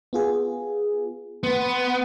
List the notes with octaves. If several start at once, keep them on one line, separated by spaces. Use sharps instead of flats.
B3 F4 G#4
B3 C6